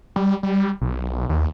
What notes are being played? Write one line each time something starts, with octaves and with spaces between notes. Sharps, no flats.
G3
G3
B1
D#2